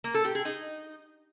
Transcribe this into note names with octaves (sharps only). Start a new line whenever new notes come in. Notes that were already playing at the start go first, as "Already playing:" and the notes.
A#3
A4
G4
G#4
D#4